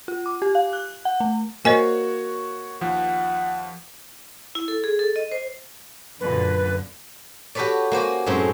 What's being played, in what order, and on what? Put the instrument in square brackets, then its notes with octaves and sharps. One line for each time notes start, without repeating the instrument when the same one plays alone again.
[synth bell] F4
D6
G4
F5
F#6
F#5
A3
[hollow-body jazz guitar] A#3 [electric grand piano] F#4 C#5 [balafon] C5 D#5 G#5
[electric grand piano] D#2 F3 [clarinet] F#5
[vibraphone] E4
A4
G#4
A4
D#5
C5
[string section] F#2 A#2 D3 [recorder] B4
[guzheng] F#4 G4 A4 B4 C#5 D5
A#3 F#4 C5 G#5
F#2 A2 G#3 C4 D#4